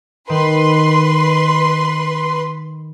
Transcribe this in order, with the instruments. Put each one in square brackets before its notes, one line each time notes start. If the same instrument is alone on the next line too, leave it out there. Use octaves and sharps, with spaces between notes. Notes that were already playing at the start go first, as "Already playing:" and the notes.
[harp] D#3 [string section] B4 C6